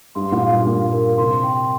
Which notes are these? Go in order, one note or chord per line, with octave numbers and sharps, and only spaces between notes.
G2 C6
A#2
F5
G2
A#2 A#4
A#4
C3 C6
G5